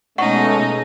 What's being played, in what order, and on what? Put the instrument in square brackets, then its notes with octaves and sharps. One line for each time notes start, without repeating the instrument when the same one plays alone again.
[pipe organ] B2 G#3 A3 [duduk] C#4 [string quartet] D#4 [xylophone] F#5 C#6